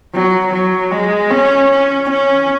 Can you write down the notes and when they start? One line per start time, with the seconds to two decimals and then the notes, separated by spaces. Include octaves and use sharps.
0.14 F#3
0.53 F#3
0.92 G#3
1.31 C#4
1.70 C#4
2.09 C#4